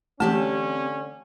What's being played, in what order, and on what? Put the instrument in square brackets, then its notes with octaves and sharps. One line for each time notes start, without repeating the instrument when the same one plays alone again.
[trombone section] D3 C#4 [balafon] E3 A3 [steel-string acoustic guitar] C4 G4 A5